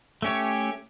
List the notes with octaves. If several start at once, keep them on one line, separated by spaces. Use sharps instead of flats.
A3 C#4 G4 C#5